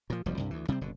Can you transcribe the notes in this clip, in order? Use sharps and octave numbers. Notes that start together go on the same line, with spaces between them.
A#2 F3
E1 D2 F3 G3
C2 G2
D2 E3
C3 G3 A3 C4
F#1 B2 D3